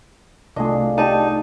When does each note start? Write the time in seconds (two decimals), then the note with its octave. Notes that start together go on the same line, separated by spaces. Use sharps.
0.56 C2 A3 D4 F4 G#4 D#5
0.98 D#4 G4 D5 A5